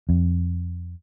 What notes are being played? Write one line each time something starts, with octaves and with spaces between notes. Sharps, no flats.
F2